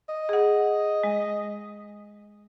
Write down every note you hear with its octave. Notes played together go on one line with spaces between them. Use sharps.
D#5
G#4 F#5
G#3